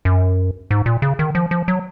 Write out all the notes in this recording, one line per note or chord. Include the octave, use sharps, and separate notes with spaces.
F#2
G#2
A#2
C#3
D#3
F3
F3
F#3